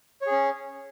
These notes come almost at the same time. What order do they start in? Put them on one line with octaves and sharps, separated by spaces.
C#5 G#4 C#4